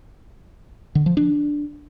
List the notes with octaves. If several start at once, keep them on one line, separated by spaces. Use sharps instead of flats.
D3
F3
D4